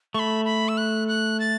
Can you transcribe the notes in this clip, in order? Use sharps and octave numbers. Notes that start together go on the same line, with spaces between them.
A3 B5 C#6
B5
E6
F#6
F#6
A6